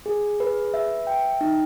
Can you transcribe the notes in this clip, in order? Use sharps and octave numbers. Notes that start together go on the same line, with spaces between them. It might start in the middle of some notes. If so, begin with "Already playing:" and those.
G#4
B4
E5
G5
D#4